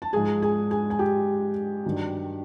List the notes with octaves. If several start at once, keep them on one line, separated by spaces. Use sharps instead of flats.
A5
G#2 F3 G#3 G#4 G#5
G#4 G#5
G#4 G#5
G#5
G4 G5
G2 D#3 F#3